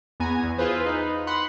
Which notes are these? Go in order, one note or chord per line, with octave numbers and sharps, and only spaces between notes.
E2 B3 G#5 A#5
E2
E4 F4 G#4 B4 C5
D#4 B4
F#5 B5 C6